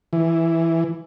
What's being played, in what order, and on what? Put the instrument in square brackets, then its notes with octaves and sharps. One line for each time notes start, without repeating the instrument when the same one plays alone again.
[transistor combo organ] E3